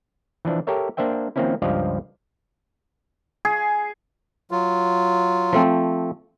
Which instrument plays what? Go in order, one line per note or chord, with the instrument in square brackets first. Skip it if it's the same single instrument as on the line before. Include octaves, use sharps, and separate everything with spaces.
[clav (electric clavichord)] E3 F3 D4
G4 A4 A#4 C#5 E5
A#3 D4 C5 E5 G5
D#3 F3 A#3 C4 C#4 E4
C#2 G2 F3 D5 D#5 F5
[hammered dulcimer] G#4
[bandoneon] F#3 F4
[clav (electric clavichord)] F3 A3 C4